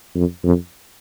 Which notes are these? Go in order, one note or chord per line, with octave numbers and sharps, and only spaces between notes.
F2
F2